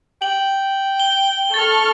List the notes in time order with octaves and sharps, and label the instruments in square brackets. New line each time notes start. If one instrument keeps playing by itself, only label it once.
[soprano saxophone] G5 [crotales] F#7
[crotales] G7
[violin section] A4 C#6 F6 [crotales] A6